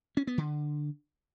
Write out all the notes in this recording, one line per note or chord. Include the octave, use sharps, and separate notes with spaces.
C#4
B3
D3